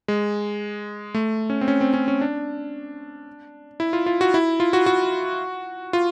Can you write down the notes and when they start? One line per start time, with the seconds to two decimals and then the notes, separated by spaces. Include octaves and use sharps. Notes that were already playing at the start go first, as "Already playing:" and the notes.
0.08 G#3
1.14 A3
1.50 C#4
1.61 C4
1.68 C#4
1.81 C4
1.94 C#4
2.08 C#4
2.21 D4
3.80 E4
3.93 F4
4.06 F4
4.21 F#4
4.34 E4
4.60 F4
4.73 F#4
4.86 F#4
5.93 F4